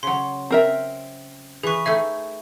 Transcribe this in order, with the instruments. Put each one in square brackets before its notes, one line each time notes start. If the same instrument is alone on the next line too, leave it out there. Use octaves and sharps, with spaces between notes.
[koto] C#3 F#3 [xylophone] C6
[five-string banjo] C4 A#4 E5
[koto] E3 B4 [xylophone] G#4 C#6
[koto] A3 D#4 G#4 [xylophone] E5